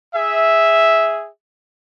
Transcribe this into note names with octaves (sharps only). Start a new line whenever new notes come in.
G#4 E5